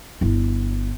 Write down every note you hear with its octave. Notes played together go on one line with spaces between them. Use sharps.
G1 E4